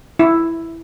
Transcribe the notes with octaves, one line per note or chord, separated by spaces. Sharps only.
E4